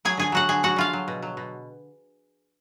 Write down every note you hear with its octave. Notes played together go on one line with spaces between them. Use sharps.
F#3 G#4 G#5
D3 G#4 G#5
F#3 F#4 F#5
D3 G#4 G#5
F#3 F#4 F#5
D3 F4 F5
F#3
B2
F#3
B2